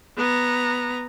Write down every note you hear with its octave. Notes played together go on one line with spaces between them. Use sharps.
B3 A#5